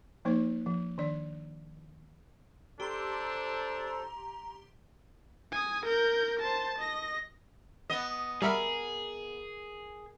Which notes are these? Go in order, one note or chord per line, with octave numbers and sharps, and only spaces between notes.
F3 A#3 D#4 C5
F3
D#3 D4 D5
D4 G4 A4 C5 A#5 C6
G#5 D#6
A#4 G6
C5 A5
D#5 A#6
B3 D#5
G3 G#4 A#4 E5 F#5 A#5 B5